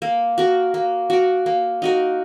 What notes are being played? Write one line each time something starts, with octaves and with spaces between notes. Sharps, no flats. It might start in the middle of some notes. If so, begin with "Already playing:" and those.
A#3
F#4 A#4
A#3
F#4 A#4
A#3
D#4 F#4 A#4